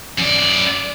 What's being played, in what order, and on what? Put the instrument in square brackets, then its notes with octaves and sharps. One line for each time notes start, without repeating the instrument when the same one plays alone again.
[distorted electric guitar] F#2 D5